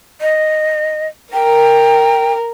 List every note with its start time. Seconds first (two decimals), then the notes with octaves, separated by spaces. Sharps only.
0.21 D#5
1.33 A#4 G5